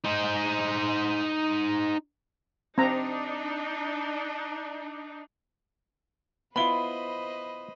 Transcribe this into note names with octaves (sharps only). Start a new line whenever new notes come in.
D#4 C5
C4 D4 D#4 A#5
B3 E4 F4 B4 C5 D#5 B5 G7